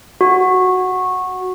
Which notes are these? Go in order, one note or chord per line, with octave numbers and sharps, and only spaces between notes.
F#4